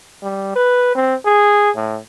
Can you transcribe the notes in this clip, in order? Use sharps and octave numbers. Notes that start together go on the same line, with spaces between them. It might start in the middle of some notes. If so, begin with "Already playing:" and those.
G3
B4
C4
G#4
A2